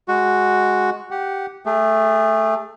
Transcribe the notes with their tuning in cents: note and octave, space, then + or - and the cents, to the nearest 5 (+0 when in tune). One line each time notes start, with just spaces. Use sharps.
G#3 +0 F#4 +0
G4 -10 F#5 +0
A3 +0 G#4 -35